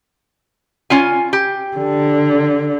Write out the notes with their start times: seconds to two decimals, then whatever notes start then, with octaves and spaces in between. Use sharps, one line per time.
0.90 C#4 F4 G#5
1.33 G4
1.77 D3